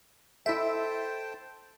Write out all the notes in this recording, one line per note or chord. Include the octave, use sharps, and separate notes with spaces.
E4 A4 C5 D#5 E5 G5 A5